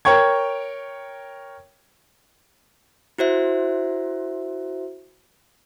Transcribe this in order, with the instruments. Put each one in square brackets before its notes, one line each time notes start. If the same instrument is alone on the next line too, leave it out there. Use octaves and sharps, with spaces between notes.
[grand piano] A#4 C#5 G5 C#6 G#6
[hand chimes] E4 F#4 C5 E5